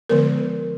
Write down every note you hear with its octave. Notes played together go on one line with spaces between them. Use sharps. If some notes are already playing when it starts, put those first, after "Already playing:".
D3 F3 G#3 B3 A#4